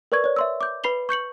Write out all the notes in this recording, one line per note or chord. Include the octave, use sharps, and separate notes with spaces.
A#4 B4 D5 C#6 G#6
C#5 D5
E5 C6 E6
D6 G6
B4 B5 C7 F7 G7
C#6 G6 C#7 F#7